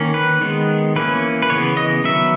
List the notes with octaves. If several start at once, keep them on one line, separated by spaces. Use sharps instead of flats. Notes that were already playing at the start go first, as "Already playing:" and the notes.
Already playing: D#3 A#3 C#4
B4
D#3 G#3 B3
E3 A#3 C#4 B4
B4
C#3 E3 B3 C#5
D#5
D#3 F#3 B3 E5